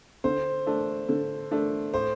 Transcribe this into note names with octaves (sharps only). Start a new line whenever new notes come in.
D3 C5
A3 D4
D3
A3 D4
A2 C5